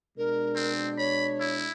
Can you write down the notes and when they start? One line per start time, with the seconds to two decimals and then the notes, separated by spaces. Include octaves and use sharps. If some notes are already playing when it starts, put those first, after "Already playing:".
0.18 B2 G#3 D4 A#4
0.56 C4
0.98 C#5 B5
1.40 E4